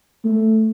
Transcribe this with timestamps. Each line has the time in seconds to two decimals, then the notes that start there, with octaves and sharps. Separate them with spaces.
0.25 A3